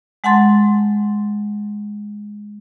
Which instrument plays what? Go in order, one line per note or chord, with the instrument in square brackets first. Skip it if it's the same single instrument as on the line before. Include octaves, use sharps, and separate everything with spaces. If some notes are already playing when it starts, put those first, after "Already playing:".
[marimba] G#3 F#5 A5 C6 A6